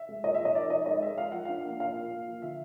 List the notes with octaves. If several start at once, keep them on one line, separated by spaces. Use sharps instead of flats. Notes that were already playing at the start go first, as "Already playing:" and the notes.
Already playing: E5
G#3
A#2 D#5
F3 E5
D#5
D#4 D5
D#4 D#5
G#3 D#5
G#3 E5
F3 F5
F3 F#5
D4 F5
A#3
A#2 F5
A#2
A#3
F3
D3 E5